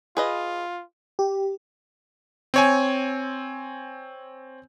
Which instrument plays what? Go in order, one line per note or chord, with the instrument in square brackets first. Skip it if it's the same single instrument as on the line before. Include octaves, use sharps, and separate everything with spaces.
[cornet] F4 [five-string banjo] G#4 B4 D#5
[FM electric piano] G4
[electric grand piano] C4 C#5 G#5